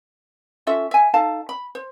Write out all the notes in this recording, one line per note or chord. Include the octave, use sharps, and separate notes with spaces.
C#4 F4 A4 E5
E5 G#5
D#4 A4 F5 A5
B5
C5